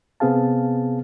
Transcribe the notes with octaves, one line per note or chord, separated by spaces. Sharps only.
C3 B3 C4 G#4 F5 A5